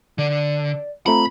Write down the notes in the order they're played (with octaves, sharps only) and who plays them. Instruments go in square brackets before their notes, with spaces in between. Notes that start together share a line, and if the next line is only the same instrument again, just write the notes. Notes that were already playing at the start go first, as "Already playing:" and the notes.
[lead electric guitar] D3 [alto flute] D5
[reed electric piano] A3 C4 F4 [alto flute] A#5 [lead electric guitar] B5